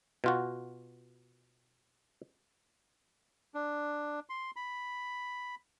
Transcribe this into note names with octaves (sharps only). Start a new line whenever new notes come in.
B2 F4 F#4
D4
C6
B5